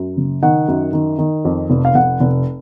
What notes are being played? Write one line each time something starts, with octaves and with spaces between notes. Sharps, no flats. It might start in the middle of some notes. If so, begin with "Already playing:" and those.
Already playing: F#2
F#1
D#3 F#5
F#2
D#3
D#3
F2
F1
F5
F1 F#5
F1